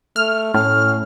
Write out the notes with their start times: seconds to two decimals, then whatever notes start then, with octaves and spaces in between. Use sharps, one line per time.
0.16 A3 F6
0.54 A2 C#4 F6